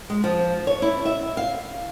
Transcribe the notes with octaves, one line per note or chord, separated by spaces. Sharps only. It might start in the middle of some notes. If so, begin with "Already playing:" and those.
G#3
F3
C#5
E4
E5
F5